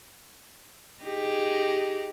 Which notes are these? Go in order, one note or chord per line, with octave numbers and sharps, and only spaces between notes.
D#4 G4 G#4